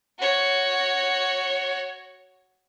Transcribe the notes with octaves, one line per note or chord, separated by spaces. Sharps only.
F#4 C#5